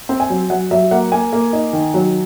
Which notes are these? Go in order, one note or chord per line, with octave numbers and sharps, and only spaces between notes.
C4
G#5
F#3
F#3 F#5
F#3 E5
A#3 F#5
A#3 G#5
A#3
D#4
D#3
F#3